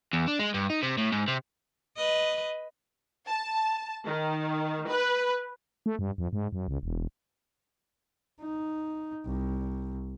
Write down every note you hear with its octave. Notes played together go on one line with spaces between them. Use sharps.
E2
D4
G#3
G2
D#4
C3
A2
G#2
C3
B4 D#5
A5
D#3
B4
A3
G2
F2
G#2
F#2
C#2
E1
D#4
C2